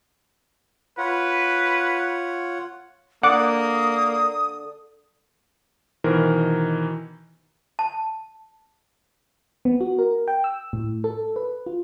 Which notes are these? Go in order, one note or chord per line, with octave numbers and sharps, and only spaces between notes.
F4 B4 C#5 F#5
D3 A#3 F#5 D6 D#6
B2 D#3 E3 A#4 C5 A#5
A5
B3
F#4
A#4
G5
E6
A2
A4
B4
F4